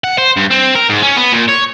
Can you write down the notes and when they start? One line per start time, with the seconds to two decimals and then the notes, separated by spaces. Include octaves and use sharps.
0.04 F#5
0.18 C5
0.37 G2
0.51 C4
0.76 A#4
0.89 G#2
1.02 C#4
1.17 B3
1.33 A#2
1.49 C#5